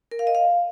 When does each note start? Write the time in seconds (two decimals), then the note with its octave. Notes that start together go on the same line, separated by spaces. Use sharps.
0.12 A#4
0.19 F5
0.27 D#5
0.35 F5